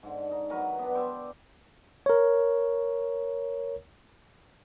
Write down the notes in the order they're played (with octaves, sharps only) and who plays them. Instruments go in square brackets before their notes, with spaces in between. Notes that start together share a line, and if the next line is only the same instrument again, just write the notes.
[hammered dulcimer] G#2 D3
D#4 A#5
E3 F#3 A#4 B4
B3 D4
D5 E5 G5 C6
[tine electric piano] A#4 C#5